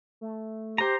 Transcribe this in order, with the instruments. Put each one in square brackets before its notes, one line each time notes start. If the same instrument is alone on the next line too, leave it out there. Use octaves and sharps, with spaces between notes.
[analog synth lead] A3
[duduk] G4 [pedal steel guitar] C5 A#5